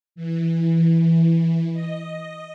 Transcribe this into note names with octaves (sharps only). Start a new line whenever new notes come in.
E3
D#5